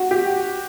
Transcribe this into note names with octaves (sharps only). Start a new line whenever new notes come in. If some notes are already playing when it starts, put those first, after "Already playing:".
Already playing: F#4
G4